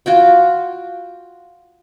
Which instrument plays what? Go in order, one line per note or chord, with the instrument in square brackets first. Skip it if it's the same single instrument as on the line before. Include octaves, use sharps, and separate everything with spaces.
[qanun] F4 F#4 G5